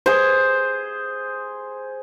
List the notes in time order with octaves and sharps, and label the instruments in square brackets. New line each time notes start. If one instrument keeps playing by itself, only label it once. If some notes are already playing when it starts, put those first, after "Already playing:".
[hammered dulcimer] G#4 C5